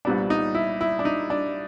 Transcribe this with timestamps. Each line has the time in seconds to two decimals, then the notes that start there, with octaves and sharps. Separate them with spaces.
0.05 C2 A#2 G3 B3 D4
0.30 D#4
0.55 E4
0.81 E4
0.99 D4
1.05 D#4
1.30 D4